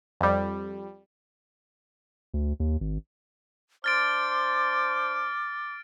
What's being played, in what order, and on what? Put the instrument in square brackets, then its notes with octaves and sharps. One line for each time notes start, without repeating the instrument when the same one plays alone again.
[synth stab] F2 G3
[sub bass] D2
D#2
G#1
[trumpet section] D4 C5 [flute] D6 [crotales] F6 A6 D7